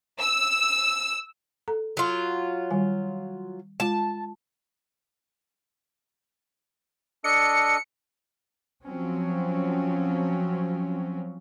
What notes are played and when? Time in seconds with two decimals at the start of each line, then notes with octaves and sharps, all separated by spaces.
0.20 E6
1.68 A4 A#5
1.97 F#3 F4
2.71 D#3 G3 G#5
3.80 G#3 F4 A5
7.24 D4 A4 D#5 C#7
8.84 F3 F#3 C4 C#4